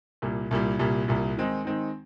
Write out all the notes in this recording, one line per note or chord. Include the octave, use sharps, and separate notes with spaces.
C2 A#2 G3
C2 A#2 G3
C2 A#2 G3
C2 A#2 G3
D#3 G#3 C4 D#4
D#3 G#3 C4 D#4